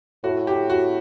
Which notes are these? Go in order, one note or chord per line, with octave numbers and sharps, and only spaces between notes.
A2 F#4
G4
F#4